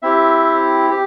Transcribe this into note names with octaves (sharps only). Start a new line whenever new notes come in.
C4 E4 G4 E5
G4